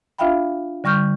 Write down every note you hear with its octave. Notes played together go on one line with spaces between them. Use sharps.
D4 F4 E5 F5 G5 B5
D3 G3 C#6 F6 G6